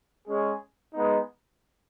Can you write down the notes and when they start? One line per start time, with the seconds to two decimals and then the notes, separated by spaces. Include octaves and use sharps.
0.28 G#3 C#4 G#4
0.94 G#3 B3 D#4